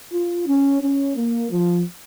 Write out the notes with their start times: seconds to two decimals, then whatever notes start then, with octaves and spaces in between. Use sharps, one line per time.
0.12 F4
0.47 C#4
0.82 C#4
1.16 A#3
1.51 F3